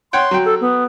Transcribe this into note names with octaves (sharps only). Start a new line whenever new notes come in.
C#5 F#5 G5 C6
F#3 G5
A4
B3